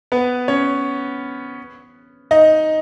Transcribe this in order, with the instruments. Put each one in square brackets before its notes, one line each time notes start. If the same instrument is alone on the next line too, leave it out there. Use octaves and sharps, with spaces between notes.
[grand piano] B3 B4
C#4 C#5
D#4 D#5